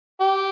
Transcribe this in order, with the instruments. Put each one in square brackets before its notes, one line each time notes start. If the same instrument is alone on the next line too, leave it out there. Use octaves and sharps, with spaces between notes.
[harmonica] G4